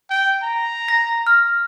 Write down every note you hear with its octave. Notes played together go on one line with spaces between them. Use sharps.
G5
A#5
A#6
F6